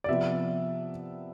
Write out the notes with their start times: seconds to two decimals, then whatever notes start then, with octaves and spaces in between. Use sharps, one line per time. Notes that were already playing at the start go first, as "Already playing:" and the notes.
0.04 D5
0.08 C3 F3 B3 E5